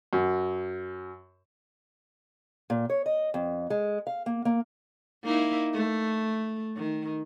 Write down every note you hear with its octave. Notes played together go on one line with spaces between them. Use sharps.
F#2
A#2
C#5
D#5
F2
G#3
F5
A#3
A#3
A#3 D#4 E4
A3
D#3